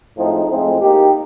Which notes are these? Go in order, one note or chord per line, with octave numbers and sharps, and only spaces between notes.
A2 F3 G#3 C4 D#4
A2 F3 G#3 C4
A#3 D#4 G4